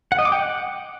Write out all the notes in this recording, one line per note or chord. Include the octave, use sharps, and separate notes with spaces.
F#5
D#5
D6
G5
F#5